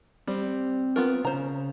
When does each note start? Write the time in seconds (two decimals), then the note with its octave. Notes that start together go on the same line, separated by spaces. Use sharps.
0.27 G3 C4
0.96 B3 F4 A#4
1.25 C#3 C5 A#5